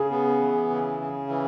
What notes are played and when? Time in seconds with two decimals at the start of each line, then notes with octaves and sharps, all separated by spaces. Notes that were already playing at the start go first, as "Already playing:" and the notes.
Already playing: C#3 G#4
0.11 B3
0.41 E3
0.70 C#3
1.00 C#3
1.29 E3